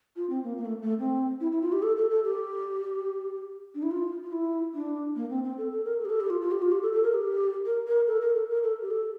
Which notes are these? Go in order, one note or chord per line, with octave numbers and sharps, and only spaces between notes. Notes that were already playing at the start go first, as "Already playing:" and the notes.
F4
C4
A#3
A#3
A3
A3
C4
E4
E4
F4
G4
A4
A4
A4
G4
D4
E4
F4
F4
E4
D4
A#3
C4
C4
A4
A4
A#4
A4
G4
A4
G4
F4
F4
G4
F4
G4
A4
A4
A#4
G4
A#4
A#4
A4
A#4
A4
A#4
A4
G4
A4